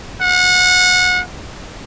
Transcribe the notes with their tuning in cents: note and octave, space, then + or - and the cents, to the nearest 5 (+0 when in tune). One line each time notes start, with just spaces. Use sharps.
F#5 -30